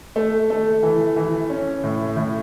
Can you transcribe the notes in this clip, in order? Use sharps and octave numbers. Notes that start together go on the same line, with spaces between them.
A3
A3
E3
E3
C#4
A2
A2